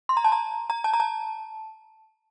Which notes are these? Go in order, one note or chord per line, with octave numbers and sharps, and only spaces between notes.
C6
A#5
A5
A#5
A#5
A5
A#5
A5